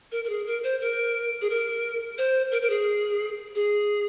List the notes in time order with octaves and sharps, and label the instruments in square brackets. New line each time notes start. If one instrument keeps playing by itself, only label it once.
[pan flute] A#4
A#4
G#4
A#4
C5
A#4
G#4
A#4
C5
A#4
A#4
G#4
G#4